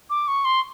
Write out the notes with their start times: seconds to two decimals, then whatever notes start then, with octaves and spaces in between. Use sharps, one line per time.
0.10 D6
0.28 C#6
0.45 C6